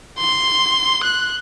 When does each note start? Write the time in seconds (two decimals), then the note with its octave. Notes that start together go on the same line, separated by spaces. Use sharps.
0.18 C6
1.03 F#6